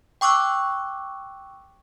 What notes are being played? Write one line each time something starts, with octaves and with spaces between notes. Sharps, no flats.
G5 C#6 D6 E6 F#6